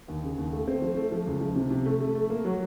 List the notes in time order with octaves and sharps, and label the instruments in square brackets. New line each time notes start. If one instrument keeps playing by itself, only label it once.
[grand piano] D#2
C#3
D#2
A3
C4
F3
A3
F3
C#2
F3
C3
C3
A3
A3
A3
A#3
F#3